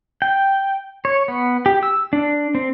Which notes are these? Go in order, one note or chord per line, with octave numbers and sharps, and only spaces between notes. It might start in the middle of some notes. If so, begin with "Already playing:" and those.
G5
C#5
B3
G4
E6
D4
C4